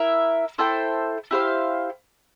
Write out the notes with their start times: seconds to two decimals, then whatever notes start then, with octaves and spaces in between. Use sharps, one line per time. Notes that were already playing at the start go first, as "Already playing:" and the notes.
Already playing: E4 A#4 E5
0.58 E4 A4 C5 G5
1.31 E4 G4 C5 F5